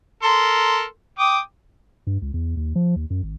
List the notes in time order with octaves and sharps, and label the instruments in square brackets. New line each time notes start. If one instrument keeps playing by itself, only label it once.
[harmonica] A4 A#4 C6
G5 D6 D#6
[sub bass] G2
C#2
E2
D#2
F3
D#2
F#2
G#1